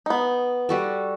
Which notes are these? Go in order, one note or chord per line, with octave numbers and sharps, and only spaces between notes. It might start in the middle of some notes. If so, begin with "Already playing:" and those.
B3 D#4
G3 F#4 A4